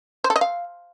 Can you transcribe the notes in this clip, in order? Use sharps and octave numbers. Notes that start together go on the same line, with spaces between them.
C5
A4
D#5
F5